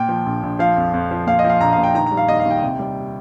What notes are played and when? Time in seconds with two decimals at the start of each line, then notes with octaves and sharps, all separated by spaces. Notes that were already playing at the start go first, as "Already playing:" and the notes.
Already playing: A#2 G5
0.09 F3
0.26 A#1
0.43 A#1
0.59 F3 F5
0.77 F2
0.94 F2
1.11 F3
1.27 A#2 F5
1.39 D#5
1.44 F3
1.50 F5
1.61 A#1 A#5
1.73 F5
1.78 A#1
1.83 G5
1.95 D#3 A#5
2.06 A#5
2.11 G3
2.17 F5
2.28 D#2 D#5
2.39 F5
2.45 D#2
2.50 G5
2.62 C3
2.79 G3